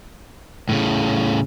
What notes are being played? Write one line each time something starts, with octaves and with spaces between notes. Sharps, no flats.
A2 C#3